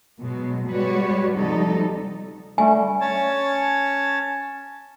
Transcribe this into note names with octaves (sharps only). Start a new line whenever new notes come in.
B2 F#3 G#3
G3 G#3 F#4 B4 C#5
D2 C3 F3 G3 D#4 A4
D3 G3 A3 G#5
C#4 C#5 A5